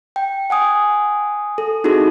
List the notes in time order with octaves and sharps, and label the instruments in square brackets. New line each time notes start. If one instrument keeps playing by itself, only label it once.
[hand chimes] G5
F#5 G#5 D#6
A4
C4 D#4 E4 F#4 G#4 A4